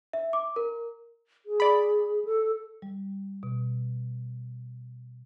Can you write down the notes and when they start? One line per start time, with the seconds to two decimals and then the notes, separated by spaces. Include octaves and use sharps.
0.13 E5
0.33 D6
0.56 A#4
1.46 G#4
1.60 D5 B5
2.25 A4
2.82 G3
3.43 B2